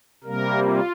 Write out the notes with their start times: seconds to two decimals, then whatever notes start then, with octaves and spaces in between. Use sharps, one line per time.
0.24 C3 G3 A#3 A#4
0.64 F4